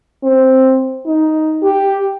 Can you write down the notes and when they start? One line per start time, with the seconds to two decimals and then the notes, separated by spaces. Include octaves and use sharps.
0.23 C4
1.07 D#4
1.63 G4